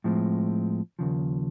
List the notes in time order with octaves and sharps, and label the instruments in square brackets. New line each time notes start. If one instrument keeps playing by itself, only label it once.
[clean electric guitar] A2 F3 G#3 C4
D#2 C#3 F3